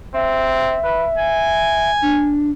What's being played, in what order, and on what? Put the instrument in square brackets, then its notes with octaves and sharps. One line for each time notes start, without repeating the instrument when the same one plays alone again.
[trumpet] C4 [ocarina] E5
[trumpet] B4
G#5
[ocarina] D4